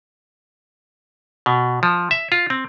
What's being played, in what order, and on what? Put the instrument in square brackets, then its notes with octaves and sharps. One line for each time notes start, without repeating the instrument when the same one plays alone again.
[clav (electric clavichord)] B2
F3
E5
F4
C4